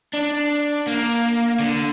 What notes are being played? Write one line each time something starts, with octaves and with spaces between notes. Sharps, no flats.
D4
A#3
D3